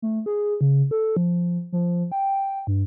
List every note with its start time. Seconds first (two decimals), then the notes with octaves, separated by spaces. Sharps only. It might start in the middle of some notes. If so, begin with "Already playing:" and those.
0.02 A3
0.26 G#4
0.61 C#3
0.91 A4
1.17 F3
1.72 F3
2.12 G5
2.67 G2